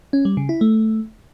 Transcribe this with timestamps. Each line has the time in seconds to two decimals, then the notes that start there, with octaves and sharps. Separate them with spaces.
0.13 C#4
0.25 G3
0.37 C#3
0.49 E4
0.61 A3